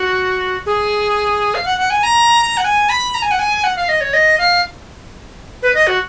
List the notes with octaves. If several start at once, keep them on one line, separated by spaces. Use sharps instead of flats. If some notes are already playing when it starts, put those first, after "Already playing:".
Already playing: F#4
G#4
F5
F#5
F#5
G#5
A#5
F#5
G#5
B5
A#5
G#5
F#5
G#5
F#5
F5
D#5
C#5
D#5
F5
B4
D#5
F#4